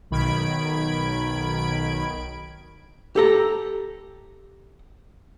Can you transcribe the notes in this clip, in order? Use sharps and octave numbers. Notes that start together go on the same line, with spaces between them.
B1 D#3 B5 G#6 D7
G4 A4 A#5